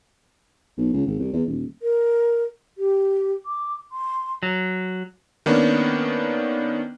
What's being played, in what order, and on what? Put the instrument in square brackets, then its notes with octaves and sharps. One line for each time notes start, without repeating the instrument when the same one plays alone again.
[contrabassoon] B1
C#2
G#1
C2
E2
D#1
[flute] A#4
G4
D6
C6
[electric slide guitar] F#3
[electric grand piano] D#3 A#3 B3 C#4 D4